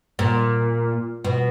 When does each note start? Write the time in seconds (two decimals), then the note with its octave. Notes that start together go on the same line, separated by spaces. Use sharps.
0.19 A#2
1.25 B2